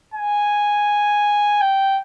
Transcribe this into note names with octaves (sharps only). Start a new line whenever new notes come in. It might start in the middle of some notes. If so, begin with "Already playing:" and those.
G#5
G5